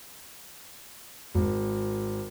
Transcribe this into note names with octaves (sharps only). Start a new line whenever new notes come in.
G#1